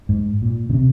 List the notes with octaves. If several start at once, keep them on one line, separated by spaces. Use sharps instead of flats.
G#2
A#2
C#3
C3